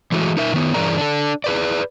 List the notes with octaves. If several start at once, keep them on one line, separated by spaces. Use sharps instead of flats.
E3 G#3 A3 F#4
D#4 A#4 E5
A2 D#3 B3
G2 E3 G#4 A#4 D5 A#5
D4 A4
G#4 B4 D5